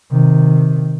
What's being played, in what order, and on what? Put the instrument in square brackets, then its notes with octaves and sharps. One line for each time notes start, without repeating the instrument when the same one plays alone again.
[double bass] C3 D#3